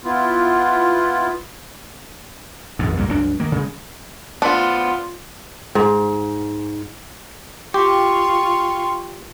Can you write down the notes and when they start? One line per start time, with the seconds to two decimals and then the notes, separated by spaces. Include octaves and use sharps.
0.04 B3 E4 F4
2.79 G#1 F2 G#2
2.97 C#2 G2 A3 A#3
3.08 G1 C#2 F#3 D4
3.40 D#3 A#3
3.52 C#3 G#3
4.42 B3 D4 F4 C5
5.75 G#2
7.74 F4 G4 G5 C6 C#6